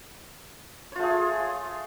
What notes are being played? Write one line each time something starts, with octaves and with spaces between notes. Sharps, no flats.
A3 F4 G#4 C#5